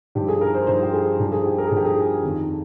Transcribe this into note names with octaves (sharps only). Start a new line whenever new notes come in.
G2 F3 G4
G#4
A#4
C5
G2 F3 C5
G4
G#4
G2 F3
G#4
G4
A#4
G#4
G2 F3 G4
G#4
F2 D#3